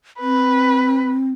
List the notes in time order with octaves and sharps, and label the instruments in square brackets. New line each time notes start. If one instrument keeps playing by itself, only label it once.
[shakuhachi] C4 [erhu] B4